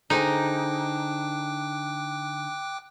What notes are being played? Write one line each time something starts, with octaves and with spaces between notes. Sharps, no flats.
D3 D#4 G#4 C5 G5 D6 F#6